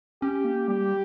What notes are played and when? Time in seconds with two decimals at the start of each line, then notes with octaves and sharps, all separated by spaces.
0.22 C#4 G4
0.45 A#3
0.68 G3 G4